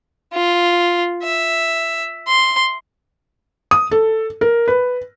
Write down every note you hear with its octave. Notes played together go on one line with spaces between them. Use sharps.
F4
E5
C6
D#6
A4
A#4
B4